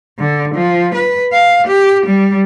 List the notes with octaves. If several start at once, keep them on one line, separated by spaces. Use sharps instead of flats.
D3
F3
B4
F5
G4
G3